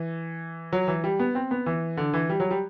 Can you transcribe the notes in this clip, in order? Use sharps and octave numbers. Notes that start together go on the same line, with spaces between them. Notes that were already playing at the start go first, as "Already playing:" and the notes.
Already playing: E3
F#3
E3
G3
B3
C4
B3
E3
D3
E3
G3
F#3
G3